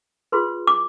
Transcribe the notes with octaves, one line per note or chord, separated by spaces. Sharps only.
F4 G#4 B4 C6
D6